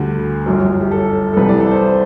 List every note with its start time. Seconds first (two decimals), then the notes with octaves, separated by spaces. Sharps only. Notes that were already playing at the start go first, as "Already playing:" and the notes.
Already playing: D2 D3 G3 F#4
0.46 G1 F#2 F#3
0.81 G4
0.92 A4
1.33 A4
1.37 C2 C3 E3 B4
1.49 D5
1.60 A4
1.71 C5